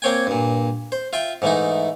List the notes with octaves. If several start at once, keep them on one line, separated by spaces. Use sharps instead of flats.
A#3 C4 C#5 G5 G#5
G2 A#2
C5
F4 E5 G5
G#2 E3 A3 D#4